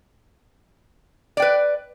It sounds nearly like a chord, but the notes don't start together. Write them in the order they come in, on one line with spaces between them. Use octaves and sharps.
D5 G5 B4